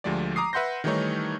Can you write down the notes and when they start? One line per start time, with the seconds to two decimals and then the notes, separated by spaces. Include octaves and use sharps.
0.04 D2 F3 G#3 A3 G4 D5
0.36 A#5 D6 D#6 C7
0.53 B4 E5 F#5 C6 G6 A#6
0.84 D#3 E3 G3 A3 D#4 C#5